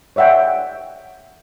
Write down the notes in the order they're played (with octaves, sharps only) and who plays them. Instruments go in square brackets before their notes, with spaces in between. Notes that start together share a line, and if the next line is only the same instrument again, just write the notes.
[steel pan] C#5 D5 E5 F#5 G5